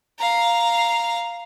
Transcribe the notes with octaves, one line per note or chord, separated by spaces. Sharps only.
F5 A#5